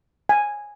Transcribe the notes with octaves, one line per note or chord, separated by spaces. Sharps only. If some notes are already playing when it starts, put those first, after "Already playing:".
G#5